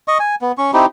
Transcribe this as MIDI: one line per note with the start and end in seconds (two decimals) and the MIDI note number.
0.08 0.18 75
0.08 0.18 85
0.20 0.35 80
0.42 0.52 59
0.58 0.71 61
0.58 0.71 85
0.73 0.86 60
0.73 0.86 63
0.73 0.86 64
0.73 0.86 67